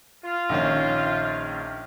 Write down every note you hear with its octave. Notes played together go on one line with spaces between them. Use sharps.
F4
A#1 D#3 C#4